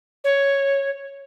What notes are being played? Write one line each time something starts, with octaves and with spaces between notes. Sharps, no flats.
C#5